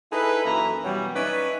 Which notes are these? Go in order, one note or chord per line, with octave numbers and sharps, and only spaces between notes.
D#4 E4 G#4 A4 B4
F#2 E3 A#3 A4 E5 A#5
B2 E3 F#3 G3
C#4 D#4 B4 D5 E5